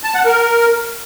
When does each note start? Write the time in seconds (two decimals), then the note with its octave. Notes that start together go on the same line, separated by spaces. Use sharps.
0.03 A5
0.14 F#5
0.26 A#4